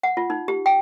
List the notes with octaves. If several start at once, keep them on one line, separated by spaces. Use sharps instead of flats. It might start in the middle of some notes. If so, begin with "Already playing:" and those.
F#5
F4
D#4
G4
G5